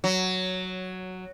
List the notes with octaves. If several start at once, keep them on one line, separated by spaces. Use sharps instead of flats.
F#3